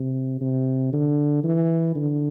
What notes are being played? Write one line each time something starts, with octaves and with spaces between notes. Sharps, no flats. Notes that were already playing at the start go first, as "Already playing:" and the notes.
Already playing: C3
C3
D3
E3
D3